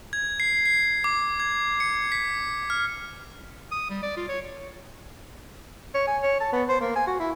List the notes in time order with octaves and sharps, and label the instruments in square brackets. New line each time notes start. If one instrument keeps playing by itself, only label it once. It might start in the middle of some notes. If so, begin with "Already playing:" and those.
[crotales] G#6
C7
C7
D6
G#6
C#7
B6
F6
[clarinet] D#6
G3
D5
F4
C#5
[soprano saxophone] C#5
G#5
C#5
A5
B3
C5
A#3
G#5
F#4
E4